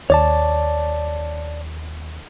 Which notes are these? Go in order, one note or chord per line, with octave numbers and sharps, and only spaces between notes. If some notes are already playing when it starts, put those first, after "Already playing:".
D#2 C#5 D5 A5